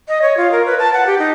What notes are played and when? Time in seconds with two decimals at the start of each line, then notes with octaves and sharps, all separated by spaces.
0.08 D#5
0.22 C#5
0.37 F4
0.52 A#4
0.66 B4
0.79 A5
0.93 F#5
1.07 G4
1.19 D#4